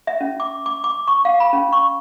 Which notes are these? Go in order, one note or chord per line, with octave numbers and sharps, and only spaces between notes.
E5
C#4
D6
D6
D6
C#6
F5
B5
C#4
C#6